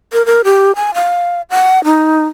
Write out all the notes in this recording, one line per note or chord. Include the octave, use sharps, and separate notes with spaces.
A#4
A#4
G4
G#5
F5
F#5
D#4